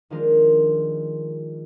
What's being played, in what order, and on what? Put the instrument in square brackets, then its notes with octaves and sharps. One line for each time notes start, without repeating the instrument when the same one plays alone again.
[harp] D#3 F3 G#3 D4 F4 A#4